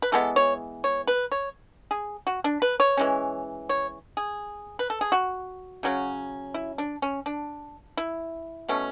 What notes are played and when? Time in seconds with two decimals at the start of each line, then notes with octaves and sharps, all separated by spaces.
0.02 B4
0.12 E3 G#3 B3 A4
0.36 C#5
0.84 C#5
1.07 B4
1.32 C#5
1.91 G#4
2.27 F#4
2.44 D4
2.62 B4
2.80 C#5
2.97 E3 G#3 C#4
3.69 C#5
4.17 G#4
4.79 B4
4.90 A4
5.01 G#4
5.12 F#4
5.83 C#3 F#3 C#4
6.54 E4
6.78 D4
7.02 C#4
7.26 D4
7.97 E4
8.68 B2 A3 C#4